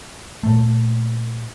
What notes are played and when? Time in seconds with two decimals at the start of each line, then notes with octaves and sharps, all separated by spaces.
0.43 A#2 A3